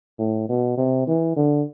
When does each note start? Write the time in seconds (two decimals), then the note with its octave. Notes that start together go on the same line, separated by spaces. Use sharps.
0.19 A2
0.49 B2
0.77 C3
1.07 E3
1.36 D3